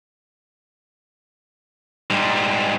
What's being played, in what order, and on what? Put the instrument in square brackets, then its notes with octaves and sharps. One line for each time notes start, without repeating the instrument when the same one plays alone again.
[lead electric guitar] G#2 G3